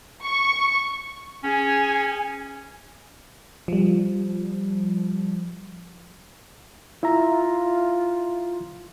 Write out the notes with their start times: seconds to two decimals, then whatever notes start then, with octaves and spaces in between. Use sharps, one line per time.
0.24 C#6
1.44 C#4 G#4 G#5
3.68 F3 G3
7.03 E4 F4 E5 A#5